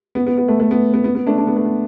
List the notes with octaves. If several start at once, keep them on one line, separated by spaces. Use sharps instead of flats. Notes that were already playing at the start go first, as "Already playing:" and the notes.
B3
B3
B3
A3
A3
B3
B3
B3
B3
A3 D4
D4
B3
A3
B3